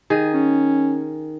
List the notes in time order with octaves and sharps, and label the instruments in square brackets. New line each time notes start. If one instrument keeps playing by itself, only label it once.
[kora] D#3 G#4
[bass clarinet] C#4